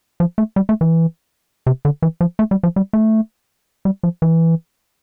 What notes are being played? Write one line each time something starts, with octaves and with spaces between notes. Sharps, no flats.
F3
A3
G3
A3
E3
C3
D3
E3
F3
A3
G3
F3
G3
A3
G3
F3
E3